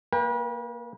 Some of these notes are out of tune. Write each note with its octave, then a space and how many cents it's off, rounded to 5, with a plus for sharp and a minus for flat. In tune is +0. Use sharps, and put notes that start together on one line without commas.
A#3 +0 B4 -40 G5 +30